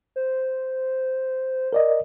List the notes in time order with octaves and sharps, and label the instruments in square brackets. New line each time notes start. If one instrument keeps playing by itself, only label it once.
[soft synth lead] C5
[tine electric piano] A#4 D5 D#5